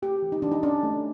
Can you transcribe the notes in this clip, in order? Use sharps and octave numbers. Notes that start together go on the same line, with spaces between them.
A3 G4
E3
D#4
E3 D4
D#4
C#4 D4
A3